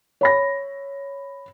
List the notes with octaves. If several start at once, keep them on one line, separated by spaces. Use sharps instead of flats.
C#5 B5 A#6